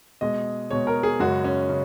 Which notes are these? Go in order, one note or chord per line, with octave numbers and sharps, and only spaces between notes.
B2 G#3 D#5
B2 G#3 C#5
A#4
G#4
F#2 C#3 G#3 F#4
C#4
C#3